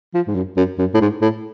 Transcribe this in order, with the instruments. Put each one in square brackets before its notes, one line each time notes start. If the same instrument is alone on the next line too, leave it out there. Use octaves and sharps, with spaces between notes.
[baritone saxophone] F3
G#2
F#2
F#2
F#2
A2
G#2
A2